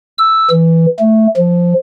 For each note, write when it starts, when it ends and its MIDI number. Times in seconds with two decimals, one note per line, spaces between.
0.18 0.50 88
0.51 0.86 52
0.99 1.27 57
1.37 1.74 53